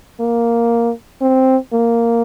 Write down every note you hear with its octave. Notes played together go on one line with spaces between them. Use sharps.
A#3
C4
A#3